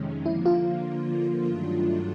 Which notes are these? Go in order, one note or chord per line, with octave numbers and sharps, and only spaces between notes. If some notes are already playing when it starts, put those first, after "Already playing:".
Already playing: F2 C3 D#3 G#3 C#4
D3 F3 A#3 E4
F4
G2 D#3 F#3 A3 D4